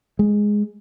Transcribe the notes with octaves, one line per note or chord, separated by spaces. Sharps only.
G#3